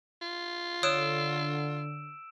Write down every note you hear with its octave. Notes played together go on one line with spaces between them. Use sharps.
F4
D3 C#5 D#6 E6 F#6 D7 E7